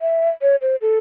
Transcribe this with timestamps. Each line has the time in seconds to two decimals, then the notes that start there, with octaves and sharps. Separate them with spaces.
0.01 E5
0.42 C#5
0.62 C5
0.81 A4